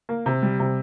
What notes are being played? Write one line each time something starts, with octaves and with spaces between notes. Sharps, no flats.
A#3
C3
G3
C3